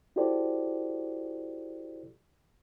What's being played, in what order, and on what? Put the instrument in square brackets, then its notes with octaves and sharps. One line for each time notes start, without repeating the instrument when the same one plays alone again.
[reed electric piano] E4 F#4 G4 A4 C5 D5